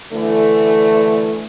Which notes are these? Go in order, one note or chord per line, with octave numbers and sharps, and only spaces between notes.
D3 E3 A3